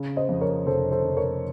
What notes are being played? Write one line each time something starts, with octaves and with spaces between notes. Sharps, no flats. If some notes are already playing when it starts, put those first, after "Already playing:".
Already playing: C#3
C5 D#5
F2
A#4 C#5
F1 A4 C5
A4 C5
F1
A#4 C#5